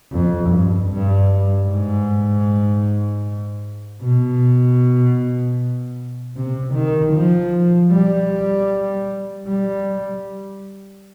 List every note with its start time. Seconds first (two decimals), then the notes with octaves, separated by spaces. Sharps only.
0.12 F2
0.50 G2
0.89 G2
1.67 G#2
4.01 B2
6.36 C3
6.74 D#3
7.13 F3
7.92 G3
9.48 G3